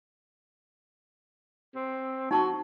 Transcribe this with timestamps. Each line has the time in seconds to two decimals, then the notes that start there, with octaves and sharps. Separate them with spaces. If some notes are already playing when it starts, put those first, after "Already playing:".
1.75 C4
2.31 D#4 F#4 A5 C#6